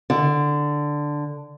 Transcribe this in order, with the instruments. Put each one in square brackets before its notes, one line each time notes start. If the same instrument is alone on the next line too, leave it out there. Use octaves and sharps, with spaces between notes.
[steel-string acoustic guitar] D3